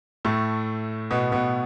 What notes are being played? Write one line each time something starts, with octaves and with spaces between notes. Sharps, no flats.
A2 A3
B2 B3
B2 B3